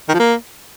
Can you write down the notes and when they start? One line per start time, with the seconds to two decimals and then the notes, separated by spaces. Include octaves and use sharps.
0.09 D#3
0.14 F3
0.19 A#3